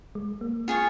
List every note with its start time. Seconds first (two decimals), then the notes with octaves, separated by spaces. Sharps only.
0.15 G#3
0.41 A#3
0.68 F4 G#4 C#5